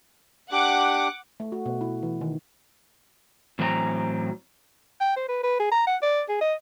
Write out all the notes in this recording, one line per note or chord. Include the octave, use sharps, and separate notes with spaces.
D4 G4 F#5 D6
A3
F#4
B2
E4
E3
D#3
A2 E3 F#3 C4 F#5 A#5
G5
C5
B4
B4
G#4
A#5
F#5
D5
G#4
D#5